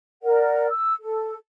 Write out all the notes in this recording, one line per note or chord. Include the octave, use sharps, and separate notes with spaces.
A#4 D5 F#5
E6
A4